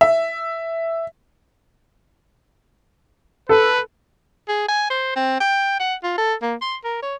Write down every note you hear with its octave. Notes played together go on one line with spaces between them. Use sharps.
E5
A4 B4
G#4
G#5
C5
C4
G5
F#5
F4
A4
A#3
C6
A#4
C#5